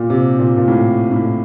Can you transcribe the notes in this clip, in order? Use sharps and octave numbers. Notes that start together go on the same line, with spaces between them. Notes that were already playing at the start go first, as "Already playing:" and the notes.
Already playing: A#2
C3
A#2
A#2
A2
A2